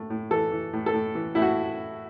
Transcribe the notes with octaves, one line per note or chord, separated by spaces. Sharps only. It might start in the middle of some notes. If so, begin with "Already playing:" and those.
Already playing: A2 A3
A2
E3 A4
E3
A2
A4
A2
E3
A2 E4
F#4